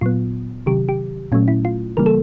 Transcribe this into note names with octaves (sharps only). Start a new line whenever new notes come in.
A#2 F#3 B3 F4
C3 D#3 F#3 G4
G4
A#2 F#3 A3 C#4
E4
F4
C#3 E3 G3 A#3 A#4
A4